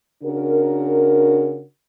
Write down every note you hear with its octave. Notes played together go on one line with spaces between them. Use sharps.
C#3 D4 F#4 A#4